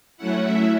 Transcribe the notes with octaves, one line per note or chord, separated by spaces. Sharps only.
F#3 A3 C#4 E4 F#5
E5